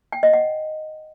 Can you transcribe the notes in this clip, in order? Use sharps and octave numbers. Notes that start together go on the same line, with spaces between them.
G5
D#5
F#5